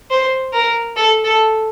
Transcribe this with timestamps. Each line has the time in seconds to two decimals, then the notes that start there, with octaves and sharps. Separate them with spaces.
0.10 C5
0.53 A#4
0.96 A4
1.24 A4